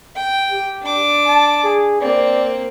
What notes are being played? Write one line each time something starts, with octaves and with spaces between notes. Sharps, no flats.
G5
G4
D4 D6
A5
G#4
A#3 C4 D5